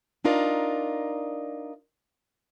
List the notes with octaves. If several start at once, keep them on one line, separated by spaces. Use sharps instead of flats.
D4 D#4 F4 A#4 D5